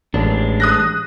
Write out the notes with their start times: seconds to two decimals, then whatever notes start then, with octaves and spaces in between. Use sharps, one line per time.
0.14 A1 G#3 D4
0.60 D#6 F#6 A#6